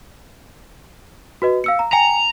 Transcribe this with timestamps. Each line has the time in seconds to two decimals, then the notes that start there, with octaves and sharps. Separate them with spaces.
1.42 F#4 B4 D#5
1.64 F5 E6 C#7
1.79 A#5
1.93 G5 G#5 A#5 C#7